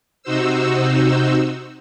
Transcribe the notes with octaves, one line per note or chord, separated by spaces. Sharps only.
C3 D#4 F#4 C5 E6